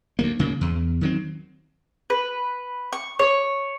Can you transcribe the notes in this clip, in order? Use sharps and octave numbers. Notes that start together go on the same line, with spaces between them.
D2 F#3 A#3
D2 C#3 A#3
E2
D#3 F#3 C4
B4
C#6
C#5